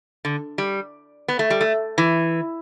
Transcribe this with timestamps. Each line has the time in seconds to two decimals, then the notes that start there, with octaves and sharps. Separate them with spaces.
0.25 D3
0.58 G3
1.28 B3
1.39 A3
1.50 G3
1.61 A3
1.98 E3